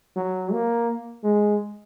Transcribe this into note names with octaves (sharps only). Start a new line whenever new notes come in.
F#3
A#3
G#3